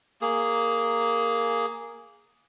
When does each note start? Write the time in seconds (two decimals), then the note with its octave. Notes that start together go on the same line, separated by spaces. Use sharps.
0.21 A#3 G#4